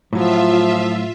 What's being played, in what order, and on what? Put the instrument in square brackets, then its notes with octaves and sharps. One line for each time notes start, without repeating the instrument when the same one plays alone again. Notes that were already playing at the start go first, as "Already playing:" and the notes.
[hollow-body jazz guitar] A2 F#3 [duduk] F3 [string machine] F4 E5